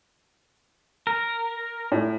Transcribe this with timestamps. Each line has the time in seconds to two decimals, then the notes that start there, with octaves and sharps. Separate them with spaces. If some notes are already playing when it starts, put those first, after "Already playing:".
1.07 A#4
1.92 A2